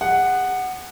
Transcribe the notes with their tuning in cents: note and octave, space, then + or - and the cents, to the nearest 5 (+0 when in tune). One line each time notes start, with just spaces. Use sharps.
G#4 -45 F#5 +0